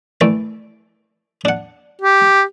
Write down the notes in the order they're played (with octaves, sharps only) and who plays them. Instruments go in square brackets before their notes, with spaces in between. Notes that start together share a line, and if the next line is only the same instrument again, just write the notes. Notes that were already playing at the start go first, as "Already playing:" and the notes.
[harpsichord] E3 A3 D5
D4 F#5
[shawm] G4